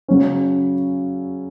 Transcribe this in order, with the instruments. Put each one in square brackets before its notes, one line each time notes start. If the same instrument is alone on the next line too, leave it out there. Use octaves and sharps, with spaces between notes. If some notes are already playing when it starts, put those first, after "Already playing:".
[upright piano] C#3 F#3 C#4